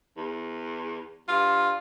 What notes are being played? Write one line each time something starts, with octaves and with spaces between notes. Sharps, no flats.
E2
G2 F4